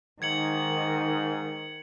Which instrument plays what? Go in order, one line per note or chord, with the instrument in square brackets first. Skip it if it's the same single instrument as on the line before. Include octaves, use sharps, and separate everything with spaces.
[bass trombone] G#2 [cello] D#3 [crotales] G#6 C#7 F#7